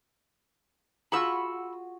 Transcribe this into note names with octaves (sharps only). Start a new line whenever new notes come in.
F4 F#4 G#4 B5 C#6 E6